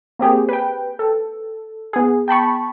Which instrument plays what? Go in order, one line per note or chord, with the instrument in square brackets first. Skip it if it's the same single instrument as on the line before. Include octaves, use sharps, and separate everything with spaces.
[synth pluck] A#3 C4 G4 G#4
B4 G5
A4
B3 G#4
G5 A5 B5 C#6